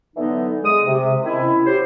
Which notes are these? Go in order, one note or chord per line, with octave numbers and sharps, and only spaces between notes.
D3 E3 F#3 B3 D#4
G#3 D#6
C3
D#3 C4 C#4 E4
F#3 G4 C5